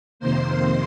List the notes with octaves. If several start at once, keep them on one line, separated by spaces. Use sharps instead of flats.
F2 C3 D#3 A#3 C5 C6